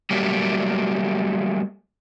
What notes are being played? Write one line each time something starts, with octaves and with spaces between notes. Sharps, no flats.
F#3 G3 A3 A#3 G4